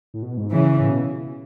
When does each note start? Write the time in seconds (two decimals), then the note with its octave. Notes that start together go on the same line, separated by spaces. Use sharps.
0.14 A2
0.22 B2
0.37 G#2
0.52 C#3 E3
0.80 A2
0.90 B2